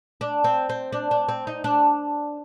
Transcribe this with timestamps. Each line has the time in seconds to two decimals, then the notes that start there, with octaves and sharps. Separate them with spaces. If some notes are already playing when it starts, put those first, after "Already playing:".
0.21 D4
0.44 C4
0.69 C4
0.92 D4
1.11 D4
1.28 C4
1.47 D#4
1.64 D4